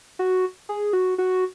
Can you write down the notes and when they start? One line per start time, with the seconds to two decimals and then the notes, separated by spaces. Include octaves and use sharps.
0.19 F#4
0.69 G#4
0.93 F#4
1.18 F#4